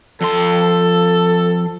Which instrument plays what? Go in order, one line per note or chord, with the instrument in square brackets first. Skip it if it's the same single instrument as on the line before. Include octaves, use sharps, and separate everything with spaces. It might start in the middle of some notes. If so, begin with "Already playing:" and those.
[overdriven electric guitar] F2 C6 [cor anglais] A4